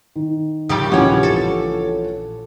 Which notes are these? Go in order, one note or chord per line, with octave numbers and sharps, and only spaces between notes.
D#3
D#2 C#3 F3 G3 G4
A#1 E3 C#4 F4 C#5 F#5
A4